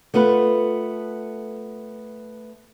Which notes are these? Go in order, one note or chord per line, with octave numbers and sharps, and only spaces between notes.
A3 B3 F4 A4 B4